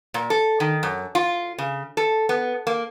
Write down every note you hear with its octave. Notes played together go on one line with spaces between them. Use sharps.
A#2
A4
D#3
F#2
F4
C#3
A4
B3
A#3